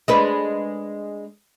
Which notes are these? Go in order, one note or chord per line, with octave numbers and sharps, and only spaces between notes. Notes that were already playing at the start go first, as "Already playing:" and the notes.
G#3 D4 B4